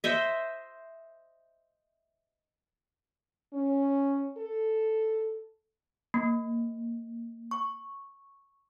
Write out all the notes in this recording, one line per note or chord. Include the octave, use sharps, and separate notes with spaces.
C5 D#5 E5
C#4
A4
A#3
C#6